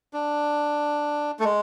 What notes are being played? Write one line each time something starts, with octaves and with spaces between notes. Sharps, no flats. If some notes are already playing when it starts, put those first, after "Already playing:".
D4
A3
G#3